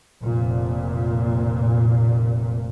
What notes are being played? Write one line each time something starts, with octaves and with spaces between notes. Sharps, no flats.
F1 A#2